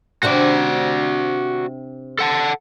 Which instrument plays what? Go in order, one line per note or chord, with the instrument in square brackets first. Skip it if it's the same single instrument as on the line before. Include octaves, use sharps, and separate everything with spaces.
[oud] C3 C4 D4 [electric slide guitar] F#4 D5
[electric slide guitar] A4 F#5 A5